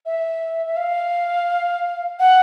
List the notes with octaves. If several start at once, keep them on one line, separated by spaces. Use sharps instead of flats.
E5
E5
F5
F#5